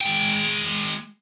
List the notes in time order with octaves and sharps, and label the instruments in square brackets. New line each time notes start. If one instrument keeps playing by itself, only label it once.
[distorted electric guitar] G#3 G5